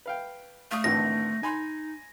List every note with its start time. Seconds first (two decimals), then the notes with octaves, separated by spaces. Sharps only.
0.06 B4 F5 G5
0.71 A3 F5 C#6 D#6
0.84 G#1 D3 E3 A#6
1.43 D#4 G#5 B5 C6